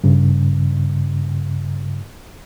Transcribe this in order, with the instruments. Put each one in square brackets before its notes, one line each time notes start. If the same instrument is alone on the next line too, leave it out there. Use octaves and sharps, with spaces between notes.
[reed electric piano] G2 C#3